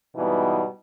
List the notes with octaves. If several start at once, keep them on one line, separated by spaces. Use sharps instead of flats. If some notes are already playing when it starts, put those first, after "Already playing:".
G#2 B2 E3 G3 B3 D#4